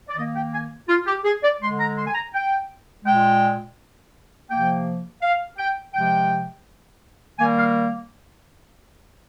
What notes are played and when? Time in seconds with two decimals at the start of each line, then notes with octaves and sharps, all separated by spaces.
0.08 D5
0.16 D#3 A#3 D#5
0.35 G5
0.53 G#5
0.88 F4
1.07 G4
1.25 G#4
1.43 D5
1.61 G#3 C6
1.64 D3
1.79 A#5
1.97 C6
2.07 G#5
2.15 A#5
2.34 G5
3.05 A#2 G#3 G5
4.49 C3 F3 A#3 G5
5.22 F5
5.58 G5
5.94 C3 F3 G#3 G5
7.39 D#3 G3 A#3 G#5
7.57 F5